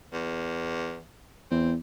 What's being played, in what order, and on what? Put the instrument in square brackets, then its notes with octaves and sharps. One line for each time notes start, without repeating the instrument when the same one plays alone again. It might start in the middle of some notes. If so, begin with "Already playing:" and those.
[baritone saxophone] E2
[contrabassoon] E2 [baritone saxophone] C4